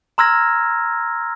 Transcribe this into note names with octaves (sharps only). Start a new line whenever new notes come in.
A#5 C6 E6 F6 G#6 A#6